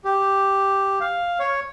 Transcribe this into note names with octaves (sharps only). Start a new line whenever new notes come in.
G4
F5
C#5